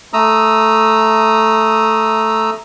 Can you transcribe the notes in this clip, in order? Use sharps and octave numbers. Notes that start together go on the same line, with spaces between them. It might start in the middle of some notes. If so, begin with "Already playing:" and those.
A3 A#5 D#6 E6